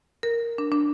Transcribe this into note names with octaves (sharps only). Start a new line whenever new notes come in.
A#4
D4
D4